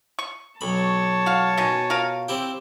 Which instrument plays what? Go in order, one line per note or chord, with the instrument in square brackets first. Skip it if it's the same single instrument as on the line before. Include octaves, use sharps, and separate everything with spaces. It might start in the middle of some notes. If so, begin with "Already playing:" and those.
[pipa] C#6
[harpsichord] B1 B5 [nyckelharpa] C#5 A5
[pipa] F#4 F5
[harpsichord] B2 [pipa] D#3 C#4 G#5
[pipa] F4 A#4 F5
[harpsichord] C4 E4 G4